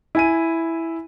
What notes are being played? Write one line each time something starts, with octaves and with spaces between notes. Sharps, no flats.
E4 G#5 D#7